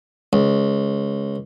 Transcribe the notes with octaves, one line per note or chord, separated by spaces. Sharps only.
C#2